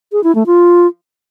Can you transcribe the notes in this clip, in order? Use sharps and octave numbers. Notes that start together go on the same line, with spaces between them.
G#4
E4
A3
F4